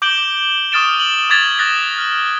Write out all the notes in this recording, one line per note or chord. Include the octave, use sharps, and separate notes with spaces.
D6 G6 D7 F#7 G7
C#6 D#6 F6 A6 D7 E7
F#7
D6 D#6 G#6 A6 B6 F7
D#6 F#6 A6 A#6 F#7
F6